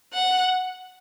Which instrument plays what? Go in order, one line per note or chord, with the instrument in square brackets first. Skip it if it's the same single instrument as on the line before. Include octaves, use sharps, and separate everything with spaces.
[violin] F#5